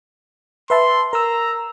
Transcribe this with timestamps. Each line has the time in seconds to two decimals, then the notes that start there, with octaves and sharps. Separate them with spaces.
0.70 B4 E5 A5 C6
1.13 A#4 A#5 E6